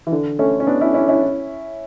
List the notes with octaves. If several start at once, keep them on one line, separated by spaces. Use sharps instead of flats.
E3
D3
A3 C#4
C#4
B3 D4
C#4 E4
C#4 E4
C#4 E4